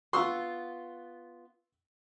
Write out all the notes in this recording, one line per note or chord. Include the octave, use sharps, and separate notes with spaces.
B3 F4 C6 C#6 E6